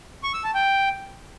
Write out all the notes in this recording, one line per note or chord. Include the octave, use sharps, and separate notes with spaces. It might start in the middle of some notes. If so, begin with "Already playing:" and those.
C#6
E6
A5
G5